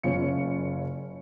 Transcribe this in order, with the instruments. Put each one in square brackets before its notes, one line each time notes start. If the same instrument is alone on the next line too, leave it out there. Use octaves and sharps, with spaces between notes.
[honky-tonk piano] F#1 C#4 F4 C#7